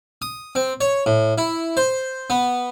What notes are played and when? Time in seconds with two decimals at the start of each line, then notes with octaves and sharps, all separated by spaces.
0.22 D#6
0.55 C4
0.81 C#5
1.06 A2
1.38 E4
1.77 C5
2.30 B3